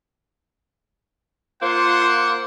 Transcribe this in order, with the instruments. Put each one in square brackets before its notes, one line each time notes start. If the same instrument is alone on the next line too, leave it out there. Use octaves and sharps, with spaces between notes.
[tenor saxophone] A#3 [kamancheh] F4 [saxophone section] C5 [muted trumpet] F#5